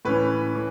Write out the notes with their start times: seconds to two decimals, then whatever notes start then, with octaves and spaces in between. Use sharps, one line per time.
0.05 A2 E3 C#4 B4
0.55 E3